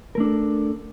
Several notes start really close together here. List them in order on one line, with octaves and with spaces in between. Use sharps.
A#4 A3 D4 A4